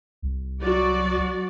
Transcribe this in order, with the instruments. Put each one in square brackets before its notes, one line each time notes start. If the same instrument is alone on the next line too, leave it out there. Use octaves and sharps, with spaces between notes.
[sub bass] C2
[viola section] F#3 F#4 D5